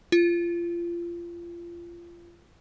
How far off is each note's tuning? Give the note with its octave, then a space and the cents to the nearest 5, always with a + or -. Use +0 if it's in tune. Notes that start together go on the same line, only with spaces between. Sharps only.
F4 -25